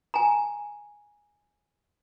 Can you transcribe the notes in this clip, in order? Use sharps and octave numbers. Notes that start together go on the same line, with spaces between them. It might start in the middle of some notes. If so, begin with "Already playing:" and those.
G#5 A#5